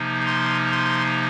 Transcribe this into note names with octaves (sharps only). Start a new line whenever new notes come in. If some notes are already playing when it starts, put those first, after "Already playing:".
Already playing: C3 F3 A#3 D#4
C6
C6